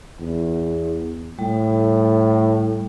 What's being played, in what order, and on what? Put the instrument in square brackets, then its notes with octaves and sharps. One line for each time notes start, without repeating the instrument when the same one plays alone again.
[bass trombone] E2
[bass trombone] A2 [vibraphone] G3